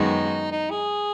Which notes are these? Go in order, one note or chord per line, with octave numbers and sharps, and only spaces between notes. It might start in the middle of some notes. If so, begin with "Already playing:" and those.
Already playing: F#2 D#3 G#3 B3 D#4 F#4
D#4
G#4